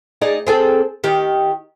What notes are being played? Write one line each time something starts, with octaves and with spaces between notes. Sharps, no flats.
D#4 G#4 D5
C4 G#4 A4
D#3 G4